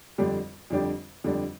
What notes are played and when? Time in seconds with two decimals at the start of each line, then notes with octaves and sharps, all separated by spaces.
0.18 F2 D3 G3 D4 G4
0.70 F2 D3 G3 D4 G4
1.24 F2 D3 G3 D4 G4